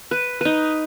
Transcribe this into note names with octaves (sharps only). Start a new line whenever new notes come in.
B4
D#4 B4